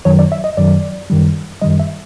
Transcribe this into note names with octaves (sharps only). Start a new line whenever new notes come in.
F#2 D#3 F#3 C#5
D5
E5
D#5
F#2 D#3 F#3 D5
F#2 D#3 G3
F#2 D#3 G3 D#5
E5